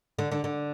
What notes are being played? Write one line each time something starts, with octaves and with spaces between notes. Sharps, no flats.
D3
D3
D3